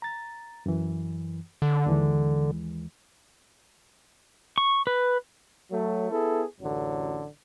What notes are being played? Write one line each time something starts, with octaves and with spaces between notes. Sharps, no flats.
A#5 A6
F#2 E3
D3
D#2 E3 G#3
C#6
B4
F#3 A3
B3 E4 G#4 A4
A1 F#2 D3 F#3